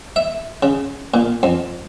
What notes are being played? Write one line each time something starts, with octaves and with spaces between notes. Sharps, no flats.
E5
C#3
A#2
F2